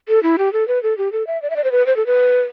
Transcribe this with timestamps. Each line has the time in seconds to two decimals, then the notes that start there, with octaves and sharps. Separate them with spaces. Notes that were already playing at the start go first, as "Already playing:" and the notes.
0.09 A4
0.23 E4
0.38 G4
0.53 A4
0.68 B4
0.83 A4
0.98 G4
1.12 A4
1.27 E5
1.42 D5
1.50 E5
1.56 D5
1.64 C5
1.72 B4
1.86 C5
1.97 A4
2.06 B4